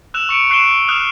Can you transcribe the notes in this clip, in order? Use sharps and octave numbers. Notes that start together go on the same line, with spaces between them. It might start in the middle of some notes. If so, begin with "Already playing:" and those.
E6 F#6 E7 F7
C#6 C#7 D7
C#6 F#6 C7 D7 E7 G7
D#6 F6 F#6 E7